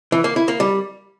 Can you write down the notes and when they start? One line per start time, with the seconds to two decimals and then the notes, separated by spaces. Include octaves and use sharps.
0.12 E3
0.24 A#3
0.36 E4
0.48 A#3
0.60 G3